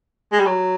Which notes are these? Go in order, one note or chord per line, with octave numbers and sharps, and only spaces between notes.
G#3
G3
F#3